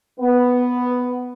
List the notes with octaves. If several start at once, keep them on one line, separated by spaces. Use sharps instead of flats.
B3